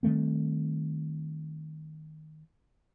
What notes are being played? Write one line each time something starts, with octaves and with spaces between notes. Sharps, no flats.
D#3 G3 A3 C4